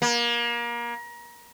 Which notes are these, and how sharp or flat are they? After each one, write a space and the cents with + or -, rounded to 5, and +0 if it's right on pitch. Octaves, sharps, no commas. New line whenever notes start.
A#3 +30